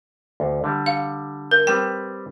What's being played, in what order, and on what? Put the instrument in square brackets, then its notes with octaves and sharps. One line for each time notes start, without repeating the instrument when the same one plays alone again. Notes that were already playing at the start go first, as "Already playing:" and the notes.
[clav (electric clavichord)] D2
D3 G3
[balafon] F5
A#4
[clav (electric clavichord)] G3 C4 B4 [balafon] G5